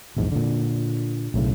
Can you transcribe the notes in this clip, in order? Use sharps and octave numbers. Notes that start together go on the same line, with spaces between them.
A#1 E2 G#2
A#2 D3
B1 A2 C#3